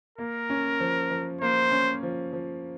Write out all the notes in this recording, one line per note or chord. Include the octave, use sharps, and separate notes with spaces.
A#3 A#4
C#4
F3
F3
A#3 C5
C#4
F3
F3